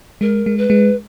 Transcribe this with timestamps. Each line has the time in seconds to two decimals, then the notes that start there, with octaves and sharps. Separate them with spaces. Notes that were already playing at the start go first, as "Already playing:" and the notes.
0.21 G#3 A#4
0.46 G#3
0.58 B4
0.70 G#3